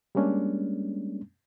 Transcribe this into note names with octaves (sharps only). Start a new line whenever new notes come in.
G3 G#3 A#3 C#4 D4